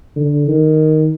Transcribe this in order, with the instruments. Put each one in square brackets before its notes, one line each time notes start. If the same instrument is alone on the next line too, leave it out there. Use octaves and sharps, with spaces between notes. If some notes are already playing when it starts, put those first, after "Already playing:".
[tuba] D3
D#3